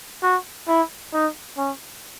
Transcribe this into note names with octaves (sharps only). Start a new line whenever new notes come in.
F#4
E4
D#4
C#4